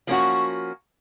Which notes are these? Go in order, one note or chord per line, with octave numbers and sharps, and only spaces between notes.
F3 A#3 C#4 F#4